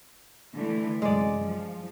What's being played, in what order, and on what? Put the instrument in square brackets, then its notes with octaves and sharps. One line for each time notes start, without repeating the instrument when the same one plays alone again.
[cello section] D3 E3 A3
[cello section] F#2 C3 [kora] G#3 D5
[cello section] F3